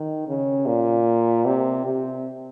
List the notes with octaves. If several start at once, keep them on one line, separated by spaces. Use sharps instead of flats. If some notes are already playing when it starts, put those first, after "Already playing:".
Already playing: D#3
C#3
A#2
C3
C3